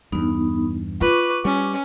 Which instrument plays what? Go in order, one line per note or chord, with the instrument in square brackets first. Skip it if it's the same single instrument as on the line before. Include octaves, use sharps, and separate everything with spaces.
[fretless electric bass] E2 G2 [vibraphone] B3 D#4
[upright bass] F4 [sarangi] B4 [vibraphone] C#6 D6
[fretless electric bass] G3 [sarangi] C#4